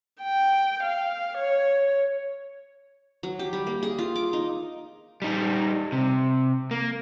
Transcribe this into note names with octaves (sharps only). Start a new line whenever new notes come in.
G5
F5
C#5
F#3
G4
G3
A#3
G#4
F4
D6
D#4
G3 D#4
C3
A#3